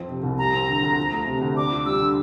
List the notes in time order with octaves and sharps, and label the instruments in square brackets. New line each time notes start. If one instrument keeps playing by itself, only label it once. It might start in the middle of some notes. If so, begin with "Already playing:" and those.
Already playing: [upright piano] F2 F3 C4
C3
C2
[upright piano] G3 [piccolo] A#5
[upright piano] C4
D3
D2
F3
A3
C3
D2
[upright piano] D4 [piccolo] D6
[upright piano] F4
[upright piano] G3 [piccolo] E6
[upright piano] D3